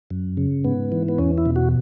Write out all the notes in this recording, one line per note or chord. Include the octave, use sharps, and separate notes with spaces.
F#2
C#3
G#2 B3
E3
B3
E2 C#4
E4
B2
F#4